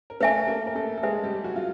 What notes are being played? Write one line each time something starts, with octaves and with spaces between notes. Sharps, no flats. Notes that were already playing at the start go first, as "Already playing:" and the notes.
A#4
A3 A4 B4 E5 G#5
A#3 A#4
A#4
A3 A4
A4
G#3 G#4 B4 E5 G#5
G3 G4
F#3 F#4
F4